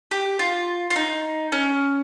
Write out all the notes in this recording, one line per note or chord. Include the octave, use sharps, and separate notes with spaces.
G4
F4
F4
D#4
C#4